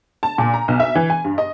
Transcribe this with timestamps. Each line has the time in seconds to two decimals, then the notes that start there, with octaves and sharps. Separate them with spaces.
0.23 A5
0.38 A#2
0.54 A#5
0.68 B1
0.80 E5
0.95 E3
1.10 G#5
1.24 G2
1.38 D#5